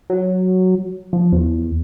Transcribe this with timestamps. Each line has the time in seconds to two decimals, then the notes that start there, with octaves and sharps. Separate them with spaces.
0.10 F#3
1.13 F3
1.32 E2